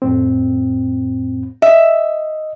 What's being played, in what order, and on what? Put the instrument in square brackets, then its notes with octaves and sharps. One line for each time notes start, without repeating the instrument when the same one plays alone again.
[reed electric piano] F2 A2 C4
[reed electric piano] D#5 [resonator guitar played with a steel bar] E5